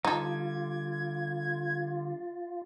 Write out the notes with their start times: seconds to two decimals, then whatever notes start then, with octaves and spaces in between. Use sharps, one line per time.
0.05 D3 G3 D#4 F4 A4 G#6